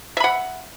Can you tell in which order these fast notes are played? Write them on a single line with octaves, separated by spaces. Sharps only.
E5 B5 F#5